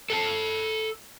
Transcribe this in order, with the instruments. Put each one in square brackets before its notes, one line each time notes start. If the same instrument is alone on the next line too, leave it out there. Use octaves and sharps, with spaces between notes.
[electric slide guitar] A4 G5 A5